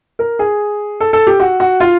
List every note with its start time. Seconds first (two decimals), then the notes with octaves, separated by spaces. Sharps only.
0.19 A#4
0.39 G#4
1.00 A4
1.13 A4
1.27 G4
1.40 F#4
1.60 F#4
1.80 F4